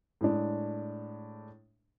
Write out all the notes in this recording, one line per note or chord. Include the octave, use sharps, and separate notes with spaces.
A2 G#3 D4